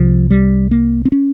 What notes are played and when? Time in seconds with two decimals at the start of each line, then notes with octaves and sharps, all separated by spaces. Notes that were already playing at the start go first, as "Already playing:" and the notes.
Already playing: C2 C3 F3
0.30 G3
0.71 A#3
1.05 C4
1.12 C#4